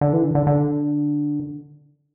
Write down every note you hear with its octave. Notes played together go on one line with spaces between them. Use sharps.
D3
E3
D3
D3
D3